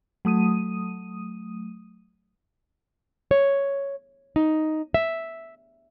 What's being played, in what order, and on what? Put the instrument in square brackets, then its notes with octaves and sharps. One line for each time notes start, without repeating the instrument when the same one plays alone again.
[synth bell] F#3 A3 D#6 D#7
[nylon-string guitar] C#5
D#4
E5